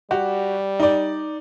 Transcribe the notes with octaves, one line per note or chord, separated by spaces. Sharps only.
G3 F#4 G4
D#4 D5